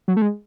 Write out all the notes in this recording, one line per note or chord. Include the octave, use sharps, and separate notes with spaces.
F#3
A3
G#3